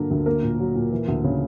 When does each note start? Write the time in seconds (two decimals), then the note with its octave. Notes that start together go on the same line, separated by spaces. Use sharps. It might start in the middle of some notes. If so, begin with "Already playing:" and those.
Already playing: G2 D3 F#3 A#3 A#4
0.11 D2
0.26 A#3 A#4
0.43 A#2
0.60 F#3
0.76 A#2
0.92 E3
1.08 D2
1.24 C#3